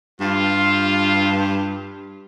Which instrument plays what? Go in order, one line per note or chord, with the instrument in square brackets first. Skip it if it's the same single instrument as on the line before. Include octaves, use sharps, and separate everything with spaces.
[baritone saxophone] G2 [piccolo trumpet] F4